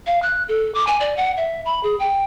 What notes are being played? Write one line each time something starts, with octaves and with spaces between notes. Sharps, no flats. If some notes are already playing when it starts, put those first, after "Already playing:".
F5
F#6
A4
D6
G#5
D5
F#5
E5
B5
G#4
G5